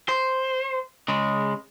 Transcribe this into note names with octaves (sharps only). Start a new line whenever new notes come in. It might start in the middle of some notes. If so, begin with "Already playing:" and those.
C5
C#3 G#3